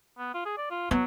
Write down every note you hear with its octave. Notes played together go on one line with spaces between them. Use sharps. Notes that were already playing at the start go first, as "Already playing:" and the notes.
B3
F4
G#4
D5
F4
F#3 B3